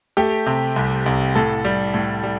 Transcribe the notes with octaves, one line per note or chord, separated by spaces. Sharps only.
A3 G4
C3
C2
C2
A2 A4
G3
A2
G3